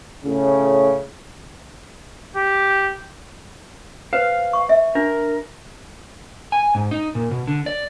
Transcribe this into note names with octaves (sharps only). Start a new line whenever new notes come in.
A2 C#3
G4
B4 C5 F5
C#6
E5
D4 A#4
G#5
G#2
D#4
A#2
B2
D3
D5